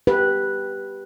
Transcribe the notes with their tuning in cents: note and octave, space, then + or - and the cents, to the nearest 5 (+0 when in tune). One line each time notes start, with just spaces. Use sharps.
G4 +0 B4 -10